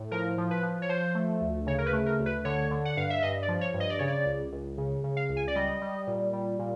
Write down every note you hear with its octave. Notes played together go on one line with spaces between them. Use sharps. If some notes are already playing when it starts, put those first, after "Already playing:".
Already playing: A2
F3 A#4
F3
B4
F3
C#5
F3 C5
A3
D2
C#3 C#5
A#4
B4
A3
A#4
D2
B4
D3 C#5
D3
F#5
G2 F5
E5
G2 D#5
D5
F3
C#5
G2
D#5
D5
C#3 C#5
D5
C#2
C#2
C#3
C#3
F5
C#2
G#5
D5
G3 D#5
G3
A#2
G3
A#2